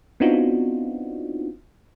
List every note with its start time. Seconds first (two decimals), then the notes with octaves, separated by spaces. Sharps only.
0.20 B3 C4 D4 D#4 F4 F#4